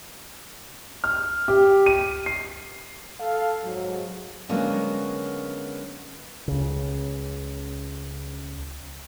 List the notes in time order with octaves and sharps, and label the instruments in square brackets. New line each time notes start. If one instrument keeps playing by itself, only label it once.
[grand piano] F6
G4
D#7
C7
[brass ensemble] A4 F5
G#2 F#3
[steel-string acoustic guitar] D3 F#3 G#3 A#3 B3 C#4
[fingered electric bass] C#2 C#3